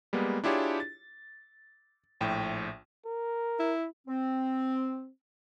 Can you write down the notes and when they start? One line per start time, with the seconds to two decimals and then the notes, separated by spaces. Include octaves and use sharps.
0.13 G3 G#3 A#3 B3
0.44 D4 E4 F4 G4 G#4 C#5
0.80 A6
2.21 A#1 A2 G5
3.06 A#4
3.59 E4
4.07 C4